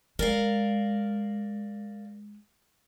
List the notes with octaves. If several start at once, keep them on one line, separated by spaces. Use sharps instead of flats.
G#3 A#4 D5 F5